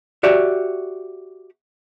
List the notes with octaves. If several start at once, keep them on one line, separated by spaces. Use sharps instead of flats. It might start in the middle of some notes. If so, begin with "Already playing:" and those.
F#4 G4 D5 E5